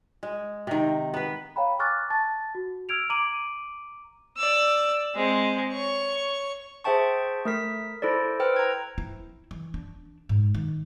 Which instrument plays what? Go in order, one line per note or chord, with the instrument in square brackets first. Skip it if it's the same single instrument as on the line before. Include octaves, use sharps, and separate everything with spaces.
[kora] G#3
C3 D#3
B3 B4
[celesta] C#5 F5 G5 A#5 B5
G#5 C#6 D6 F6 F#6 A6
A5 A6
F#4
E6 F6 G#6 D7 F7
A#5 D6 D7 D#7 F#7
[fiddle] D5 E6
G#3 C4
C#5 C#6
[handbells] G#4 C5 E5 G5 A5 C#6
A3 A#4 B6
E4 A4 C5 D5
B4 C5 G5 E6 F6
A#5 G#6
[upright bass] E4
E3
D4
G#2
D#3